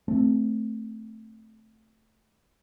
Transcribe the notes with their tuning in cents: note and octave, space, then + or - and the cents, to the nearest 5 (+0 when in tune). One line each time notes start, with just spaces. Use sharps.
A3 +0 C4 +0